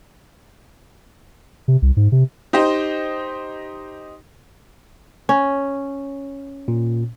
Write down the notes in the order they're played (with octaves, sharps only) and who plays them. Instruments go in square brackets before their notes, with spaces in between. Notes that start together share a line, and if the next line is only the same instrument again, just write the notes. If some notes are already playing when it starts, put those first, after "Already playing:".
[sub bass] C3
C2
G#2
C3
[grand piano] D#4 G4 C5 D#5
[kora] C#4
[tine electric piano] A#2